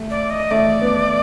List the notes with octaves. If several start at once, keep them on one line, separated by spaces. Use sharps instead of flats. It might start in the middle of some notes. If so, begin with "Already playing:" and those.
Already playing: A3
D5
D#5
A3 D5
B3